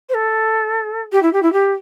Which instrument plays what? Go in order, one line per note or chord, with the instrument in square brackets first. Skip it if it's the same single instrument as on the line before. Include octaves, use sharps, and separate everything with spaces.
[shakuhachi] C5
A4
G4
E4
G4
E4
G4